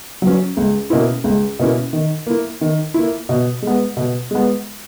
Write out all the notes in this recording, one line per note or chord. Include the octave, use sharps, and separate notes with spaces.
F#3 C#4
C#2
B2 A#3 C#4 E4
C#2
B2 A#3 C#4 E4
D#3
A#3 E4
D#3
A#3 E4
B2
G#3 B3
B2
G#3 B3